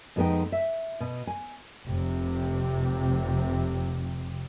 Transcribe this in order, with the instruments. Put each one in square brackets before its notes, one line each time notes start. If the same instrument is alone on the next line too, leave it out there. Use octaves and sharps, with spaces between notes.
[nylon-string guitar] F2 F3 G#3 B3 D#4 G5
E5
B2
G#5
[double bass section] F1 C3